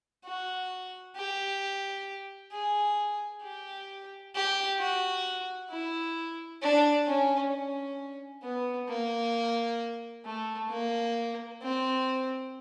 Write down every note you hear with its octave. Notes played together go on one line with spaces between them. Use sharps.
F#4
G4
G#4
G4
G4
F#4
E4
D4
C#4
C#4
B3
A#3
A3
A#3
C4